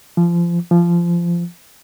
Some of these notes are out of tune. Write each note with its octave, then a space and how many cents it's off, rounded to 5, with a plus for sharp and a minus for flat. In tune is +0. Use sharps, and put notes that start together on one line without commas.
F3 -25
F3 -20